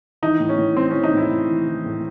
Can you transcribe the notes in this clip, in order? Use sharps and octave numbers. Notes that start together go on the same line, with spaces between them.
E3 D#4
A2
C#4
A2
E3 C4
E3 C#4
D#4
A2 E4
A2
E3
E3
A2